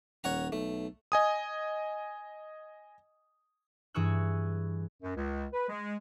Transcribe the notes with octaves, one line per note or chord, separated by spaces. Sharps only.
D#1 C#5 F#5 A#5
B1 A3
D#5 G#5 D#6
G2 E3 G#4 C#6 E6 F#6
F#2
C#2
B4
G#3